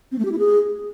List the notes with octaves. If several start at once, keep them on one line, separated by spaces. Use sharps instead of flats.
C4
A3
G4
E4
G#4